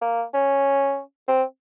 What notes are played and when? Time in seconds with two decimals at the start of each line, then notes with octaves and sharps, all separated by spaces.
0.02 A#3
0.34 C#4
1.28 C4